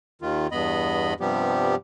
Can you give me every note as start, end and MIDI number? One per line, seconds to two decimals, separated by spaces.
0.22 0.47 39
0.22 0.47 51
0.22 0.47 65
0.51 1.14 40
0.51 1.14 43
0.51 1.14 59
0.51 1.14 75
0.51 1.14 83
1.20 1.75 43
1.20 1.75 48
1.20 1.75 53
1.20 1.75 55
1.20 1.75 59
1.20 1.75 67